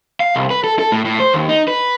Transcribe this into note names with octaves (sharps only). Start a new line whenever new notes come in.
F5
C2
B4
A4
A4
A2
A2
C5
D#2
D#4
B4